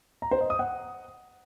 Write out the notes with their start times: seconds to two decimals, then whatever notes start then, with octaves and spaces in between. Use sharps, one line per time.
0.22 A#5
0.31 C5
0.41 D#5
0.50 D#6
0.59 F#5